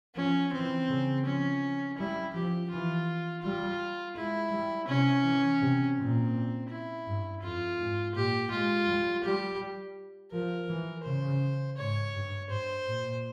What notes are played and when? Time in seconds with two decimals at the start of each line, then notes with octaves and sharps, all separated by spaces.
0.16 F3 C#4
0.53 E3 C4
0.89 C#3
1.25 F3 C#4
1.98 G3 E4
2.34 F3 G4
2.70 E3 F4
3.42 G3 F4
4.16 G#3 E4
4.52 G3
4.88 C3 C#4
5.24 E3
5.61 C3
5.97 A#2 C4
6.69 E4
7.06 G2
7.42 F2 F4
7.78 G#2
8.15 A#2 G4
8.51 G#3 F4
8.88 G3
9.24 G3 G4
10.32 F3 A#4
10.68 E3
11.04 C#3 C5
11.77 G#2 C#5
12.14 G2
12.50 G2 C5
12.87 A#2